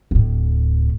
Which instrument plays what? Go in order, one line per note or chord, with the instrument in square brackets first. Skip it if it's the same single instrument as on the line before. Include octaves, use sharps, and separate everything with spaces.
[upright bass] D1 A2